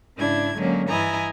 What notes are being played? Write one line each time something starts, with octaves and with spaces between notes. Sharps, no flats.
G#2 C#3 D4 E4 G#6
D3 F#3 G#3 A#3 C#4
G2 E3 E4 D#5 G#5 A#5